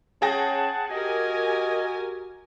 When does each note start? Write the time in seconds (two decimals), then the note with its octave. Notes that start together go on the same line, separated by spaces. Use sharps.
0.22 C#4 G#4 F#5 G5 A5 A#6
0.90 F#4 G4 A#4 D#5 G#5